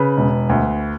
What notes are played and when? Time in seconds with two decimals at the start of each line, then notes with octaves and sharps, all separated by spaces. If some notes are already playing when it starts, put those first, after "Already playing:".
Already playing: C#3 B4
0.17 E1
0.49 D2